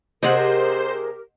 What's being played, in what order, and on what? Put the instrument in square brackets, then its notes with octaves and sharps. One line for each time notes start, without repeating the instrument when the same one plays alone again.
[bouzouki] C3 G#4 [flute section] G4 A#4 [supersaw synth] C5 [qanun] D#5 F#5